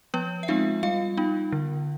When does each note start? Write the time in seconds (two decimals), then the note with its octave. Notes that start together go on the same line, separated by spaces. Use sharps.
0.14 F3 B3 B4
0.43 E5
0.48 G#3 C4 D#4 F4 F5
0.83 G3 F4 F5
1.17 B3 D#4
1.52 D3